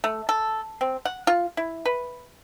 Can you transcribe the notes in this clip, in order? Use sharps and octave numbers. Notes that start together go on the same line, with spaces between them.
A3
A4
C4
F#5
F4
E4
B4